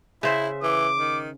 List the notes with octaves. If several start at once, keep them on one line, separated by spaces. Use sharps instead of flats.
C#3 E4 C5 E5
E3 D6
D#3